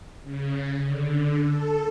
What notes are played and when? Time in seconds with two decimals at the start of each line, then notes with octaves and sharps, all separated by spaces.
0.24 C#3
0.82 D3
1.44 A4